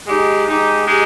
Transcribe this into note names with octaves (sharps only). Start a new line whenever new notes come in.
G#3 D#4 G4
G#3 D#4 G4
G#3 D#4 G4